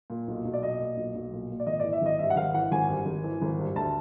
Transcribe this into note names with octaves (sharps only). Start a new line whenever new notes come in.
A#2
B1
B1
D5
A#2 D#5
A#2
B1
B1
A#2
A#2
D5
G#1 D#5
D5
E3
E5
G#1 D#5
G2 E5
F#5
G#1 F5
E3 F#5
G#1 G#5
G2
G#1
E3
G#1
G2
D2 A5